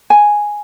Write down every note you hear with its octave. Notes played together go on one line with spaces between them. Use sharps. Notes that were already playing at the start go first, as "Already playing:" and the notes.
G#5